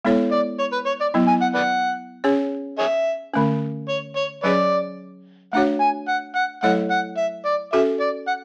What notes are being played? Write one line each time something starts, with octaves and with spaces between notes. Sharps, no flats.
G#3 B3 E4 A4 C#5
D5
C#5
B4
C#5
D5
F#3 B3 E4
G#5
F#5
B4 D5 F#5
C#4 G#4 C#5
G#4 C#5 E5
D3 A3 C#4
C#5
C#5
F#3 C#4 G#4 B4 C#5 D5
A3 D4 F#4 C#5 F#5
G#5
F#5
F#5
F#3 A3 E4 A4 C#5 F#5
F#5
E5
D5
C#4 F#4 A4 E5
D5
F#5